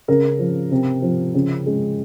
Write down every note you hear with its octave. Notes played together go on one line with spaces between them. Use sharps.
C#3 A#4
F3
C3
F3
C#3
G#3